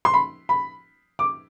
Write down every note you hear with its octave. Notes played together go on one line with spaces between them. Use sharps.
C6
B5
B5
D6